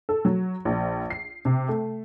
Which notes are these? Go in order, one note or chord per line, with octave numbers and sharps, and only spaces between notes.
A4
F#3
A#1
C7
C3
A3